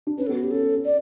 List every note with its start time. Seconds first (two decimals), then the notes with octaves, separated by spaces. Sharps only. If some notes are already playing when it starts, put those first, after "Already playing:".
0.07 D4
0.18 C#4 B4
0.27 B3 A4
0.34 F#4
0.40 C#4
0.43 G4
0.51 C#4 A4
0.62 C#4
0.74 C#4
0.85 D5